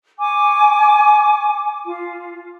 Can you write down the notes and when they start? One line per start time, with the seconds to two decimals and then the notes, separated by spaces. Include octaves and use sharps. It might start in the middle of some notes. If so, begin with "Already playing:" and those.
0.20 G#5 C#6 D6
1.85 F4